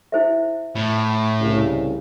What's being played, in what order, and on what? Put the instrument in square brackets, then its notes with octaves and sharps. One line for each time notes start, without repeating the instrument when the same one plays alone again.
[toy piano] E4 C5 E5
[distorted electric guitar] A2
[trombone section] C2 C#3